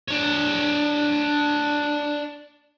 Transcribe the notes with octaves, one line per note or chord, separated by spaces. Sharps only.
D4 C#5